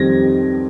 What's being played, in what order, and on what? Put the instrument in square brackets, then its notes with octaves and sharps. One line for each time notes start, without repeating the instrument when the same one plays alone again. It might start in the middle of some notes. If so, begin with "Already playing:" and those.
Already playing: [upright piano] F2 D#3 G3 C4 D#4 G#6 A#6